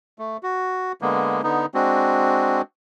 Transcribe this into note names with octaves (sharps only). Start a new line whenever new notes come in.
A3
F#4
D3 G#3 A#3 B3
D3 B3 D#4
G#3 C4 D4 F#4